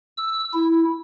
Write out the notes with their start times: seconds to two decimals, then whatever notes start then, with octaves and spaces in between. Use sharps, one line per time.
0.17 E6
0.53 E4